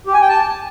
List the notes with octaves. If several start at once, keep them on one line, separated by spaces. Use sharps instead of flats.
G4
G#5
G5
A5